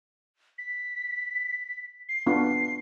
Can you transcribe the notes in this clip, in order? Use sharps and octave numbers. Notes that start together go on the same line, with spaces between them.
B6
C7
B3 D4 F4 C7